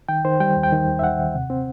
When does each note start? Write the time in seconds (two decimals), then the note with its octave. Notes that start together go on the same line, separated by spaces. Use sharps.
0.09 D#3 G5
0.25 D#3 C5
0.40 G3 G5
0.57 D#2
0.63 G5
0.72 D#3
0.88 D#2
0.99 E5
1.03 D#2 F#5
1.19 D#2
1.35 C3
1.50 C4